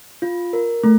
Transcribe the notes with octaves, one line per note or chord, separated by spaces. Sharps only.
F4
A#4
A3